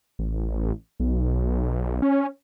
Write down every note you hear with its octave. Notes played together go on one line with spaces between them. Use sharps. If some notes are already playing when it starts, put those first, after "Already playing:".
A1
B1
C#4